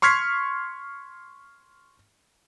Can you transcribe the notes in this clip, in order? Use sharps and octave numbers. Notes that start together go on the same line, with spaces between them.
C6 C#6 F6 G#6 B6 C7